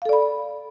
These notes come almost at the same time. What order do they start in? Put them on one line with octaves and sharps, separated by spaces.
F5 A4 D5 B5